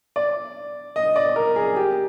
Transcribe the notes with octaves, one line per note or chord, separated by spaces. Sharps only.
D5
D#5
D5
A#4
G#4
G4